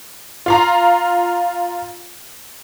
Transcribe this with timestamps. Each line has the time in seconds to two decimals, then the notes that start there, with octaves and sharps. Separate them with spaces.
0.46 F4 F5 A#5